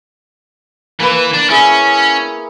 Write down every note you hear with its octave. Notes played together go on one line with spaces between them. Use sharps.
E3 A#3 A#4 B4
D4
C#4 E4 G#4